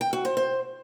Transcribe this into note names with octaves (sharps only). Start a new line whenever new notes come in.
G5
F#4
C5
C5